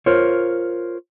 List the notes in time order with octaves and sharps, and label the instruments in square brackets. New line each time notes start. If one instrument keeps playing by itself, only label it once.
[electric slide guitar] F4 A#4 C5 C#5